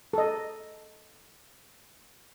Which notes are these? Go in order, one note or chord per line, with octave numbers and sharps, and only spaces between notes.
A4 D#5